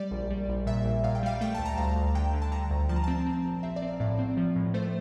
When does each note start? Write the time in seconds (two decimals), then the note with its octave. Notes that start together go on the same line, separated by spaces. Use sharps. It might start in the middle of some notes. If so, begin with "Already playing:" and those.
Already playing: G3 D5
0.11 A#1
0.30 G3
0.48 A#1
0.66 A#2 E5
0.85 A#1
1.04 A#2 F5
1.15 G5
1.23 G3 F5
1.41 A3 G5
1.55 D2 A5
1.65 A#5
1.78 D2 F5
1.96 D2
2.15 D3 G5
2.34 D3
2.42 A5
2.52 D3 A#5
2.71 D2
2.89 F3 A5
2.96 A#5
3.04 C4 A5
3.26 C4
3.44 A#1
3.63 C4 E5
3.76 D5
3.82 C4
3.88 F5
4.00 A2 D5
4.19 C4
4.37 F3
4.56 A2
4.74 A3 C5